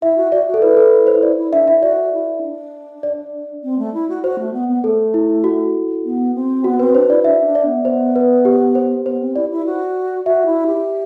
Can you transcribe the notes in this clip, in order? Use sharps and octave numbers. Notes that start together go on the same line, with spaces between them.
E4 E5
F#4
F#4 D5
F#4
A4
E4 B4
A4
C5
E4 D5
E4
D4 E5
E4 E5
F#4 D5
E4
D4
D5
C4
A3
E4
F#4
F#4 C5
A3
B3
B3
A3 A4
E4
F#4
B3
C4
B3 F#4
C4 B4
D4 C5
E4 D5
D4 E5
D4
D5
B3
B3 C5
B4
G4
C5
B3 C5
C4
E4 D5
E4
F#4
F#4 E5
E4
G4